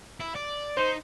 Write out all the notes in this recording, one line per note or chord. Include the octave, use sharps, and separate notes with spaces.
E4
D5
D#4 C5